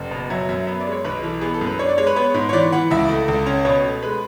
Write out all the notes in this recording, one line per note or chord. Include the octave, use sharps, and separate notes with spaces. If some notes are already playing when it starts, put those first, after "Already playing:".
Already playing: F#1
B2
F#3 E5
F#2 E5
B3 E5
D5
G#3
C#5
B1 B4
E3 A4
B3 G#4
A4
F#2
B4
D4 C#5
D5
G#3 C#5
B4
B3 C#5
G#2
C#5
E3 D5
E3 F#5
C#2 E5
A3
C#2
C#4
B2 C#5
A3
G#3 B4